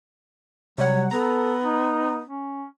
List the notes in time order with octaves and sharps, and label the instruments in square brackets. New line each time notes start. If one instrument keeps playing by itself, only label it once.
[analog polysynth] C3 G3 F#5 [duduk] F#3 [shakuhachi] C#5
[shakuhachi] B3 [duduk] A4 [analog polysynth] A#5
[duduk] D#4
C#4